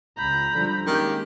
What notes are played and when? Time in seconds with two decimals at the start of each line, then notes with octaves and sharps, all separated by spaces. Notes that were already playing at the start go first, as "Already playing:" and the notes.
0.18 C#2 A#5 B5 G6
0.54 D3 F3 G3
0.87 D#3 G#3 A#3 C#4 G4